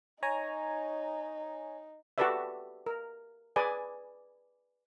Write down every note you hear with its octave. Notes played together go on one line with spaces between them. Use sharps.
D#4 C#5 G#5 A#5
F#4 G4 A4 B4 D5 E5
A#4
G#4 B4 D5 G#5